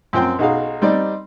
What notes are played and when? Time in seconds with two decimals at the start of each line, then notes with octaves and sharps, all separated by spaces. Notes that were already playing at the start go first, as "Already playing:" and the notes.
0.13 F#2 F3 C4 G5
0.39 B1 D#4 F#4 G#4 F5
0.82 G3 C4 D#4 D5